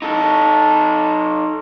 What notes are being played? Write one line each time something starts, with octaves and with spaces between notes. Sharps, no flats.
D#4 A4